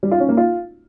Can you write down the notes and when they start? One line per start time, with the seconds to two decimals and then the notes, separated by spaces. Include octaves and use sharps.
0.03 G3
0.11 F4
0.20 C#4
0.29 A#3
0.37 F4